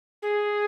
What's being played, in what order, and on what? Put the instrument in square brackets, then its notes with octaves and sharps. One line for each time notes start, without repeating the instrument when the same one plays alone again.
[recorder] G#4